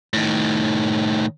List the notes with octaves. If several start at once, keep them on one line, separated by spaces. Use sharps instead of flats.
A2 D#3